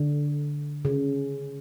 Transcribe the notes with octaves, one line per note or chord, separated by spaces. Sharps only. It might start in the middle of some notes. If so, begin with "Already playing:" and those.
Already playing: D3
C#3